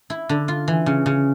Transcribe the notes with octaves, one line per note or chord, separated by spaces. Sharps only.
E4
D3
F4
E3
C#3
C#3